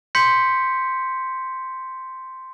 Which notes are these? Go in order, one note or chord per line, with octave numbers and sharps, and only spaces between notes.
C6 G6 B6 C#7